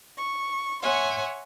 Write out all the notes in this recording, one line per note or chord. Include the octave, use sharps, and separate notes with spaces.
C#6
C#5 E5 F#5 G#5 C6